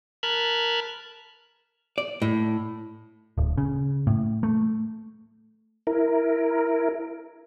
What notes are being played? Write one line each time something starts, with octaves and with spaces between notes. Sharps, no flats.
A#4 A5 B5 F6 F#6 G#6
D5
A2
D1
C#3
A2
A3
E4 A#4